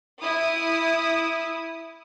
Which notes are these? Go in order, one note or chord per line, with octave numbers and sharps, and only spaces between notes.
E4 D#6